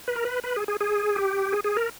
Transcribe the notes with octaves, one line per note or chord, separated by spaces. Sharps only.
B4
A#4
B4
B4
G#4
G#4
G#4
G4
G#4
G#4
A#4